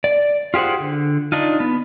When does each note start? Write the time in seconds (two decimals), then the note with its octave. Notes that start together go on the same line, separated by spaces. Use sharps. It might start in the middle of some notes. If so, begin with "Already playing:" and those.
0.04 D5
0.54 F4 G4 G#4 C5 F#5
0.80 D3
1.32 D4 D#4 F4
1.60 B3